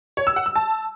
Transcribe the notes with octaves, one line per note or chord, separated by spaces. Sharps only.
C#5
E6
F#5
E6
A5